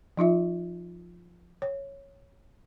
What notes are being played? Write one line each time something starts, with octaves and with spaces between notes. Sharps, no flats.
F3 D#4 F4 E5
C#5